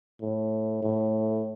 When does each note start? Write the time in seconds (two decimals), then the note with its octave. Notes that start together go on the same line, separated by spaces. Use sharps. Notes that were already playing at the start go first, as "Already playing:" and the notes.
0.22 A2
0.82 A2